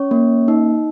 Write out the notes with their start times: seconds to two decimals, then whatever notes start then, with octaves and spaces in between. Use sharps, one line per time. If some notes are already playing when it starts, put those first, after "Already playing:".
Already playing: C#4 C#5
0.11 A#3
0.48 D#4